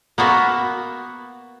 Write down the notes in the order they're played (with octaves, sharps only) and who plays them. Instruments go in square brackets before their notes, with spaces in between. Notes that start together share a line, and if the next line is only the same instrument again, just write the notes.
[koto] A#3 B3 F#4 E5